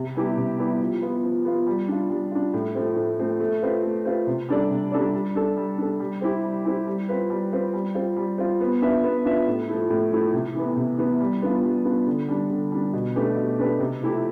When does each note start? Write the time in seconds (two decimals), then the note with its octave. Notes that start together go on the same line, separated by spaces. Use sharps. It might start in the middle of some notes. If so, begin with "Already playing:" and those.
Already playing: C3
0.15 G3 B3 E4 G4
0.37 C3
0.58 G3 B3 E4 G4
0.80 F3
1.02 B3 F4
1.23 F3
1.45 B3 F4
1.67 G3
1.88 D4 F4
2.10 G3
2.31 D4 F4
2.54 A2
2.75 F3 A3 C4
2.96 A2
3.18 F3 A3 C4
3.40 A3
3.62 C4 F4 B4
3.83 A3
4.05 C4 F4 B4
4.27 C3
4.49 G3 D4 A4 D5
4.71 C3
4.92 G3 D4 A4 D5
5.14 G3
5.35 D4 A4
5.57 G3
5.78 D4 A4
6.00 G3
6.21 C4 E4 G4
6.44 G3
6.65 C4 E4 G4
6.87 G3
7.09 C4 F4 B4
7.30 G3
7.52 C4 F4 B4
7.73 G3
7.95 C4 F4
8.16 G3
8.38 C4 F4
8.60 B3
8.82 D4 F4 B4 E5
9.03 B3
9.25 D4 F4 B4 E5
9.47 A2
9.68 F3 A3 E4
9.90 A2
10.12 F3 A3 E4
10.33 C3
10.55 E3 B3
10.76 C3
10.98 E3 B3
11.20 G3
11.42 B3 D4 F4
11.63 G3
11.85 B3 D4 F4
12.07 D3
12.28 G3 D4
12.50 D3
12.72 G3 D4
12.93 B2
13.15 A3 D4 G4 B4
13.37 B2
13.59 A3 D4 G4 B4
13.80 C3
14.02 F3 A3 E4 G4